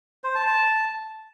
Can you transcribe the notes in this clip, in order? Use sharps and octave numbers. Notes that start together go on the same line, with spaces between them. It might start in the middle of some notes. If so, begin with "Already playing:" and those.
C5
A5
A5